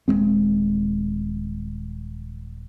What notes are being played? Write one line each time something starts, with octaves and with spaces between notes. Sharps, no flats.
D#1 G#2 G#3 C4